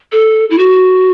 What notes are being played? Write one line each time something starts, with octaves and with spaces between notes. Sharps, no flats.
A4
E4
F#4